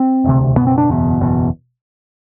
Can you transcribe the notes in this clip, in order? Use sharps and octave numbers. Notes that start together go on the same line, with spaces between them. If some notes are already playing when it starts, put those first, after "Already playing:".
Already playing: C4
E1 D2 C3
F#1 E2 B2 B3
C4
D4
F#1 E2 B2
F#1 E2 B2